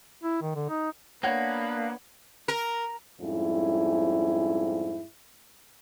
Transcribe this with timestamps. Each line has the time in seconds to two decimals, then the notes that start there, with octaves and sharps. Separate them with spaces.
0.23 E4
0.42 D#3
0.55 D3
0.69 D#4
1.23 A#3 B3 D4 B4 C#5 F#5 G#6
2.48 A#4
3.21 F2 G#2 G3 C#4 E4